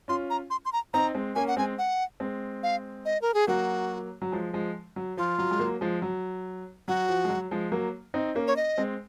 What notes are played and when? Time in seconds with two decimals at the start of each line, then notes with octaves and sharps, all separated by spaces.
0.08 C#4 F4 C6
0.30 A#5
0.50 C6
0.65 C6
0.73 A#5
0.94 C4 D#4 A#5
1.15 G#3 C4
1.35 A#3 C#4 G#5
1.48 F#5
1.56 G#3 C4 G#5
1.78 F#5
2.20 G#3 C4
2.63 F5
3.05 D#5
3.22 A#4
3.34 G#4
3.47 F#3 A#3 F#4
4.22 F#3
4.32 F3 G#3
4.53 F3 G#3
4.96 F#3
5.17 F3 F4
5.39 F#3
5.51 G#3
5.59 F#3 A#3
5.81 F3 G#3
6.02 F#3
6.88 F#3 F#4
7.09 F3
7.24 G#3
7.29 F#3
7.51 F3 G#3
7.72 F#3 A#3
8.14 C4 D#4
8.35 A#3 C#4
8.47 C#5
8.56 D#5
8.78 G#3 C4